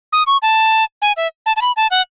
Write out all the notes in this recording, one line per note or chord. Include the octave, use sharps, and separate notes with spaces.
D#6
C#6
A5
G#5
E5
A5
A5
B5
A5
F#5